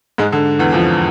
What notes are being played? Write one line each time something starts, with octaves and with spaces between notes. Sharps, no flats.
G#2 G#3
D3
E2 E3
F2 F3